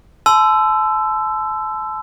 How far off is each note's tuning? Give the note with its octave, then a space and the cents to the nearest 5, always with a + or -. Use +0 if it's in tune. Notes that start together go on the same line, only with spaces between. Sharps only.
A5 -35 C6 -30 E6 +10